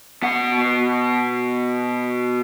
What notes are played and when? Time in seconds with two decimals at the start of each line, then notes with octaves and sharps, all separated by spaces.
0.23 B2 F#5